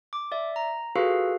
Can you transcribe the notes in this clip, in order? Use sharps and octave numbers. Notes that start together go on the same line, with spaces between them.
D6
D5 E5
A#5
F4 F#4 G#4 A4 B4 F5